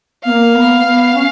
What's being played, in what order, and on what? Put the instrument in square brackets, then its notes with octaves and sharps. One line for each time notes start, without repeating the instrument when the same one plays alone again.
[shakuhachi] B3 [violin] F5
[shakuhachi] A#3
B3
B3
C#4